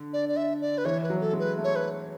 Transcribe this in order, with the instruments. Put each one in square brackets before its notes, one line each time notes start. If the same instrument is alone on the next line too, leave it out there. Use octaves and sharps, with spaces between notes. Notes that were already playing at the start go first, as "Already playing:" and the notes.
Already playing: [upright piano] D3
[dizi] D5
D5
E5
D5
B4
[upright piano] E3 [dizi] C#5
[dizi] B4
[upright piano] F#3
[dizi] A4
[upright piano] G#3
[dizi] B4
[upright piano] A3
[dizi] C#5
B4